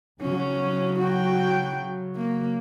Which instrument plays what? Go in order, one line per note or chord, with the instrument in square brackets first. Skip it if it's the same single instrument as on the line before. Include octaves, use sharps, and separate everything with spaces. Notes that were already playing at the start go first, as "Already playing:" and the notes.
[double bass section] C#3 F#3 [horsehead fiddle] C#4
[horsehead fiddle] F#4 G5
A#3